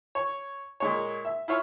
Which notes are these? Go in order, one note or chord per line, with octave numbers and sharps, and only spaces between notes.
C#5
A#2 G#3 C#5
E5
E4 F4 C#5